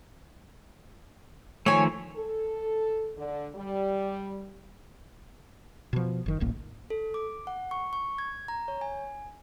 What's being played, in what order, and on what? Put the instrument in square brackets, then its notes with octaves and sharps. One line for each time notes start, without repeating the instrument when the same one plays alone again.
[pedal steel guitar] D#3 F3 A3 [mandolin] C#5 G#5
[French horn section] A4
D3
G3
[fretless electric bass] B2 F3
F#1 D#3
D1 A1 A#3
[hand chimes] A4
D6
F#5
C#6
C#6
G#6
A#5
C#5
G#5